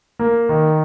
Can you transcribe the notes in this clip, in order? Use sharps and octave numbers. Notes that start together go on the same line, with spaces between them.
A#3
D#3